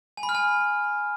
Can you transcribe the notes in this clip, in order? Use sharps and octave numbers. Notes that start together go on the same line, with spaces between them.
G#5
B5
F6
G#5